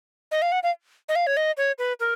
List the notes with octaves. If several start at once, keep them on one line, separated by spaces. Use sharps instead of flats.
D#5
F5
F#5
F5
D#5
F5
C#5
D#5
C#5
B4
A#4